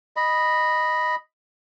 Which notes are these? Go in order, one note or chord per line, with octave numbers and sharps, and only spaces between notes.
D#5 B5